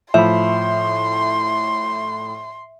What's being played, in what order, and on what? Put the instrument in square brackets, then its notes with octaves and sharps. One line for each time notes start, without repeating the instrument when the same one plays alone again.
[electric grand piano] A2 B5 [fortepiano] F3 [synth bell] E5 [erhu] C6